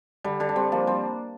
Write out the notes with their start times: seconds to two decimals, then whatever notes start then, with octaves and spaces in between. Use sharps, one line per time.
0.24 D3 G3
0.40 D3 G3
0.49 D4
0.56 G3 C4
0.72 F3 A#3
0.87 G3 C4